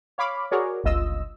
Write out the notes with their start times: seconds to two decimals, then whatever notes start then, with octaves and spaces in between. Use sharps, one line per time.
0.18 C#5 F5 B5 D6
0.51 F#4 G#4 A#4 C#5 D5
0.84 G1 C#2 F4 D#5 E6